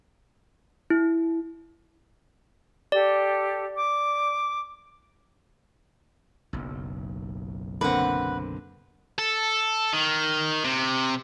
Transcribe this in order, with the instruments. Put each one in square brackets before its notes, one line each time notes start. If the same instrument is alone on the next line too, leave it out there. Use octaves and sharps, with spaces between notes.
[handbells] E4
[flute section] G4 A4 [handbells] D5
[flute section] D6
[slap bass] F#1 B1
[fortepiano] D3 A#3 C4 [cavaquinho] B4 F#5
[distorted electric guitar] A4
D#3
C3